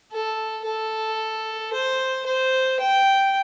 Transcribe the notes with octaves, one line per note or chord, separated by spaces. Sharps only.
A4
A4
C5
C5
G5